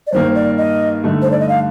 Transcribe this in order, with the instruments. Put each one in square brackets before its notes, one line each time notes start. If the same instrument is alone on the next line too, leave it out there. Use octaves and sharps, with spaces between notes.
[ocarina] D5
[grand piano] G2 D#3 A#3 [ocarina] C5
[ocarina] D5
D#5
[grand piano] G2 D3 A3 D#4
[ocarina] C5
D5
D#5
F5